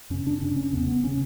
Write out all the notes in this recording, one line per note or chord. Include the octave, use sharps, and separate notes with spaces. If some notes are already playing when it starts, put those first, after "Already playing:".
F#2 C#3 C#4
D4
F#2 C#3 C#4
C#4
E2 C#3 B3
B3
C#3 C#4